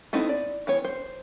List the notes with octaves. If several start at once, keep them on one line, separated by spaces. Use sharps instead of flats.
B3 C4 D#4 E4 A4
D5
E3 B3 C#5
C5